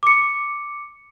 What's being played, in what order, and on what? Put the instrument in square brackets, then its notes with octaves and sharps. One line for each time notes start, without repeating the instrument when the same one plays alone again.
[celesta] D6 C#7